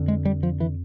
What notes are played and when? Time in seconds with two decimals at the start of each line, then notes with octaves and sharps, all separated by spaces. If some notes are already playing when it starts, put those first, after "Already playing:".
Already playing: F2 D3
0.08 G#3
0.25 G3
0.43 F3
0.60 E3